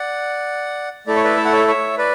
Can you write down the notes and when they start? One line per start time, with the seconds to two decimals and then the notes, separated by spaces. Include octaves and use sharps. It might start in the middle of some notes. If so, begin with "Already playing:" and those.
Already playing: D5 F#5
1.07 A3 E4 A4 D5
1.16 C#5
1.24 B4 D5
1.37 E5
1.45 F#5
1.53 C#5 E5
1.68 C#5 E5
1.98 B4 D5